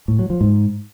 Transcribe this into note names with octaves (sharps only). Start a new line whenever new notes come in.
A2
F#3
F3
G#2